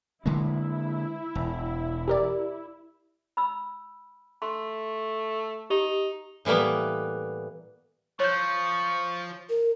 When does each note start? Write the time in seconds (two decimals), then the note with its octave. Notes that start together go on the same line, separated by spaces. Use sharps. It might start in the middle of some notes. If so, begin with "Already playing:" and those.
0.26 D3 G#3 A#3 E4
1.35 E1
2.08 G4 A#4 D5
3.37 B5 E6
4.42 A3 C6
5.70 D#4 G4
6.45 A2 E3 G3 A#3 B3
8.20 F3 C#5 C#6 G6
9.49 A#4